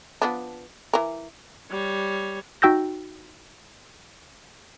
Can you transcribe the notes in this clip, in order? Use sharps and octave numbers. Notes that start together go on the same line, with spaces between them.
F3 B3 D4
E3 A#4
G3 C#5
D#4 F#4 G5 E6 G6 A#6